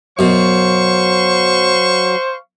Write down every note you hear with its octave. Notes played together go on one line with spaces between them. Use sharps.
F#2 B2 F#3 C5 F5 C#6